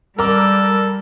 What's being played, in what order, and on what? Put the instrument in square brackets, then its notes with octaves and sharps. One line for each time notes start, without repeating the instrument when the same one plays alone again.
[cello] G3 [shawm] A4 [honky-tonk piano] A#4 D6